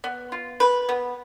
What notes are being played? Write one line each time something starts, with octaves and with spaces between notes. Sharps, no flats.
B3
F4
B4
B3